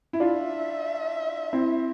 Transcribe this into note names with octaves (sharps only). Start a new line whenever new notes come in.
E4
D4 F4 E5
C4 E4